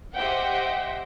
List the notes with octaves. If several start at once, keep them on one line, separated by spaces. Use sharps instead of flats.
G4 C5 D#5 E5 F#5 G5